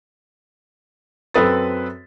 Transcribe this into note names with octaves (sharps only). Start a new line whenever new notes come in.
F#2 C4 A4 B4 D#6 A6